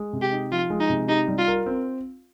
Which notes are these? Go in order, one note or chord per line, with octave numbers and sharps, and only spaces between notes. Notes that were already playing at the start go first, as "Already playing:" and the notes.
Already playing: G#3
C3
G4
D#4
F3 F4
G#3
D#4
C3
D#4 G4
G3
F4
A#4
C4